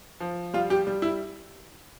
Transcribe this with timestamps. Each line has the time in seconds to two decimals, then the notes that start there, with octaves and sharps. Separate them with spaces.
0.20 F3
0.54 G3 F4
0.70 G4
0.87 G3
1.02 E4